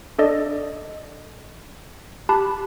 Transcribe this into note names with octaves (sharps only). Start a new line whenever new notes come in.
D4 A4 D5 D#5
G4 A5 B5 F#6